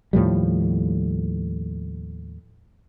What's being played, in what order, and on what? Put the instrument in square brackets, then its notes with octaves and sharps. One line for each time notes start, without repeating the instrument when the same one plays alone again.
[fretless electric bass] D#2 A2 F3 G3